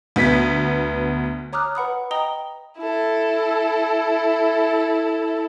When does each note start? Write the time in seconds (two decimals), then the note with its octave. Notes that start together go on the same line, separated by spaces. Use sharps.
0.16 D2 B3 B6
1.53 C#5 A#5 D6 D#6 F6 F#6
1.75 B4 F#5 B5 D#6
2.11 D#5 G5 A#5 D#6 G7
2.78 E4 A4